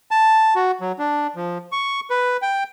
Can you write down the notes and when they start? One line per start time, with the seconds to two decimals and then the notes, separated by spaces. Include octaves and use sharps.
0.11 A5
0.55 F#4
0.81 F#3
0.99 D4
1.36 F3
1.72 C#6
2.10 B4
2.42 G5